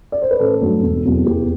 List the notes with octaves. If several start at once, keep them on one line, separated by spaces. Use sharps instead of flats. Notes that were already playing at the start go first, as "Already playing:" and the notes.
D5
C5
B4
A1 A4
G2 F#3 A3
E1
E2 C3 F#3
E2 G4